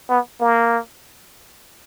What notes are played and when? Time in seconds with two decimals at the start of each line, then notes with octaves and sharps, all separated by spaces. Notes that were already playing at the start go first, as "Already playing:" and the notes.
0.10 B3
0.40 A#3